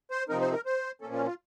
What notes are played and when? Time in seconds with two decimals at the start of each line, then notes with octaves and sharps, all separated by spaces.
0.11 C5
0.29 C3 F3 C4 D#4 A#4
0.41 C5
0.53 A#4
0.66 C5
1.01 A#2 F3 A#3 C#4 A4
1.14 F4
1.26 F4